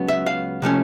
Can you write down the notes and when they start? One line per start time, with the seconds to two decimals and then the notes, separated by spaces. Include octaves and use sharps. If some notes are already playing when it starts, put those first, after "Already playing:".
Already playing: C#2 C#3 F#3 B3
0.08 E5
0.26 F5
0.62 C3 F3 A3 C#4